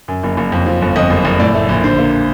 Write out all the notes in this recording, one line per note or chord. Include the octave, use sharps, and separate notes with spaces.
F#2
F#1
F#1
F2
F3
G1
F2 D#5
F#1
F#1
A2 D5
A3
A#1
D3 C5
A#3